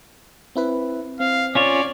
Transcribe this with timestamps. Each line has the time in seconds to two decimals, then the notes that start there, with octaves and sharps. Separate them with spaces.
0.55 C4 E4 B4
1.20 C4 F5
1.55 C#4 F4 C#5 D5